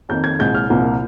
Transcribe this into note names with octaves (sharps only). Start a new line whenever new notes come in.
F2 D#3 A#3 G6
G#6
C2 A#2 G#3 G6
F6
C2 A#2 F3 A#3